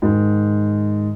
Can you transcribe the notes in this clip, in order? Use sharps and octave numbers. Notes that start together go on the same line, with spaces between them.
G#2 D#3